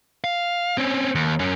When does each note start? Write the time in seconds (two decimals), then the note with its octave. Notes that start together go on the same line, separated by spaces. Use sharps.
0.24 F5
0.78 C4 C#4
1.15 D#2
1.40 F#2 C#4